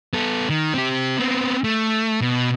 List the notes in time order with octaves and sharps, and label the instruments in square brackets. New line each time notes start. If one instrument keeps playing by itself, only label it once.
[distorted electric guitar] B3 A4
D#3
C4 G4
B3 C4
A3
B2